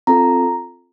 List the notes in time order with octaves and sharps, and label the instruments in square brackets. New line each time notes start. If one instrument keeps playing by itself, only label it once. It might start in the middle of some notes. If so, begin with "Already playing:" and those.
[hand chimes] C4 F4 A4 A#5